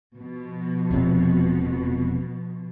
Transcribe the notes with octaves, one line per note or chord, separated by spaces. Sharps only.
B2 F3
E1 F2 C3